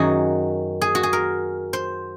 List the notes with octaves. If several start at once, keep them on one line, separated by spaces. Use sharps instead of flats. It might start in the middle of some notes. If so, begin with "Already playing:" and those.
Already playing: F#2 D#3 F#4 G#4
G#4
F#4
G#4
A#4
C5